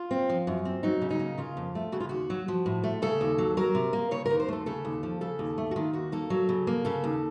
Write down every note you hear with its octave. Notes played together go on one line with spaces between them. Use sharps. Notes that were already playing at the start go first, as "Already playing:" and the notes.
Already playing: F4
C4
F3
F#2
C4
F#3 D#4
C#3
D#4
A#3
C#3 F4
F2
A3
C#3 F#4
F4
D#2 F#4
F#3
F3
A2
A3
C#3 A4
D#2
F#3
F#3 A#4
C3
A#3
C#3 C#5
D#2 A#4
C5
A3 A4
C#3 A4
D#2
F3
C#3 A4
D#2
A3
F#4
D#3 F4
D#2 F#4
A#3 A4
F#3
C#3
A#3
C#3 A4
D#2